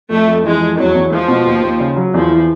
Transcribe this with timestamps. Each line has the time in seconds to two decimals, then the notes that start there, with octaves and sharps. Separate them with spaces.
0.10 F2 A3
0.27 F2
0.44 E3 G#3
0.61 F2
0.78 E2 F#3
0.95 E2
1.11 F3 G#3
1.28 B2
1.46 D#2
1.63 D#2
1.80 C#3
1.96 F#3
2.13 E2 F3
2.30 E3